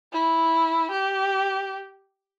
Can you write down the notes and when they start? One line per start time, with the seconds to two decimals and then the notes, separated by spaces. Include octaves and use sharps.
0.13 E4
0.92 G4